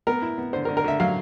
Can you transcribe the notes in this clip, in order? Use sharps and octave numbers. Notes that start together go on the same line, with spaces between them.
B3 A#4
E4
B3
D3 C5
A#4
D3
A#4
D3 E5
F#3 F5